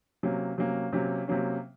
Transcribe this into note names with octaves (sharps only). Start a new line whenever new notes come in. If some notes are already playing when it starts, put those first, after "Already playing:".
C3 F#3 A#3 C#4
C3 F#3 A#3 C#4
C3 F#3 A#3 C#4
C3 F#3 A#3 C#4